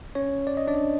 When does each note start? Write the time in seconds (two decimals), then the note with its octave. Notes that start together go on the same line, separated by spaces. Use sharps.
0.15 C#4 C#5
0.47 D5
0.57 D#5
0.67 D4 D5